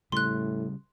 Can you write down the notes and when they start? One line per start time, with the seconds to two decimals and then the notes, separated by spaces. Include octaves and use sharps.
0.12 A2 C#3 G3 C6 F#6